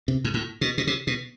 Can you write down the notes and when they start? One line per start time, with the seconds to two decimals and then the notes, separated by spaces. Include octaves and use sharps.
0.08 C3
0.24 G#2
0.34 A2
0.61 B2
0.78 B2
0.87 C3
1.07 B2